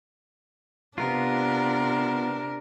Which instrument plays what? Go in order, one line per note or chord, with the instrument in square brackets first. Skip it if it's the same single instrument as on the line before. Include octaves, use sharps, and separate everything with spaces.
[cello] C3 A#4 [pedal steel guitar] B3 F4 [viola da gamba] D4